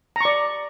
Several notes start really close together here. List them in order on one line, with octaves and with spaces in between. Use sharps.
A#5 C#6 D5